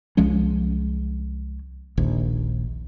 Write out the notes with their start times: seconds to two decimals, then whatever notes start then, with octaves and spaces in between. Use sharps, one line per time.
0.17 C2 F3 G#3 C#4
1.97 D#1 A#1 D#2